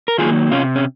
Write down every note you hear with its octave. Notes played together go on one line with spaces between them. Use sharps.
A#4
D#3 F#3 A#3 F4 G#4
C3 C#4 F4
C#4